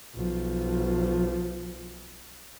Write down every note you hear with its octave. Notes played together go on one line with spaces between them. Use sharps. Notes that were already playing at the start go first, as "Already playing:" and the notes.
B1 F3